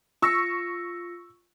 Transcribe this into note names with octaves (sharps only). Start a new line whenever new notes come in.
F4 C#6 E6 A#6 C#7